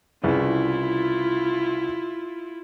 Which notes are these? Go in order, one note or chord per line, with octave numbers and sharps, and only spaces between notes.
C2 C#3 E4 F4 B4